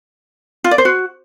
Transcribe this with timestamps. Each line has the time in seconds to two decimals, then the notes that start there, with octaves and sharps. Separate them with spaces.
0.64 F4
0.71 D5
0.78 C5
0.85 F#4